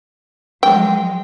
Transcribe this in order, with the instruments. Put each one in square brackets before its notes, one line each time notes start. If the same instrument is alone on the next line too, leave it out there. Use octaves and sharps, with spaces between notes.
[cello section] F3 F#3 G#3 [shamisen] G5